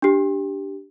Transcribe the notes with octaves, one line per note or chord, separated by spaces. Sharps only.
D4 G4